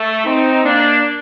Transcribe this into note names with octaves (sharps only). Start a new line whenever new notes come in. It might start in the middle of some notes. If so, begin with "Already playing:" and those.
Already playing: A3
C4 D#4
A#3 D4